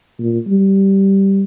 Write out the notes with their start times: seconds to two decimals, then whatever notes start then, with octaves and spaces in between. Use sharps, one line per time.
0.19 A#2
0.48 G3